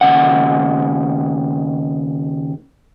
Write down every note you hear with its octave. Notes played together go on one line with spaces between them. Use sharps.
D#2 C#3 F#5